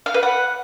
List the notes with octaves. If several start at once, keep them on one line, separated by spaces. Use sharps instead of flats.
F5
B4
F#5